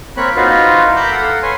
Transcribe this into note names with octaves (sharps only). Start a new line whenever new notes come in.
A#3 C4 C#5 B5 F#6
D#4 F4 F#4 B4 C5
E4 A#4
A#5 B5 D6 E6 F#6 G6
A4 F5 F#5
B4 C#5 G#5 C6